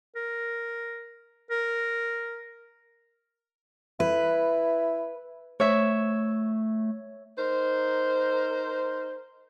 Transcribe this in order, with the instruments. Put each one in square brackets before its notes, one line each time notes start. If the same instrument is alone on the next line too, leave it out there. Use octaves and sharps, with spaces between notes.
[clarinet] A#4
A#4
[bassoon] E4 [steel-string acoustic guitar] B4
[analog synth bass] A3 [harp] C#5 E5
[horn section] D#4 A#4 C5